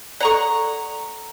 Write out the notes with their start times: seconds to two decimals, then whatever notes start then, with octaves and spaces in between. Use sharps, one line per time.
0.21 A4 D5 F#5 A#5 C#6